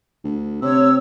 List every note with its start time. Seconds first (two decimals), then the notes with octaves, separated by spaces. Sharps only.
0.24 D2
0.62 C3 C#5 E6